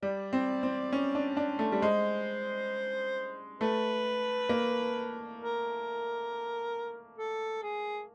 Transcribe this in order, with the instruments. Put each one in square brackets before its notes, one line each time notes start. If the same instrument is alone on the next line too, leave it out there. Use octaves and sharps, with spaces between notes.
[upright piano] G3 [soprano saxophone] D5
[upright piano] C4
C4
C#4
D4
D4
A3
G3
[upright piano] G#3 [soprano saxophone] C5
[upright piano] A3 [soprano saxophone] B4
[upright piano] A#3
[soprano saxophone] A#4
A4
G#4